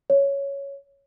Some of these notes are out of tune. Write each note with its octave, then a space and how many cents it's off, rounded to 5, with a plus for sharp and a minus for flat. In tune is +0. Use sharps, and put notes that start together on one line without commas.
C#5 +5